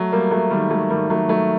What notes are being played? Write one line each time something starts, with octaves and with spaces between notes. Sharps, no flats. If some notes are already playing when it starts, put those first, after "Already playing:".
Already playing: F#3 A3
G3 A#3
F#3 A3
D#3 G3
F#3 A3
D#3 G3
F#3 A3
F#3 A3